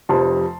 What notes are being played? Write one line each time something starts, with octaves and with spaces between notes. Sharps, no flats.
F1 F2 C3 A5 C6